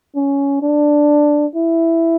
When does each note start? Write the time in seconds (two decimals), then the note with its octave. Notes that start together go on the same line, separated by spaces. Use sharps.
0.16 C#4
0.62 D4
1.55 E4